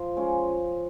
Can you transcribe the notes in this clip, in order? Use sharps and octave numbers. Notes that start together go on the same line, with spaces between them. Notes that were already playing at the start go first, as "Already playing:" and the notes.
Already playing: F3
G#3 C#4 F4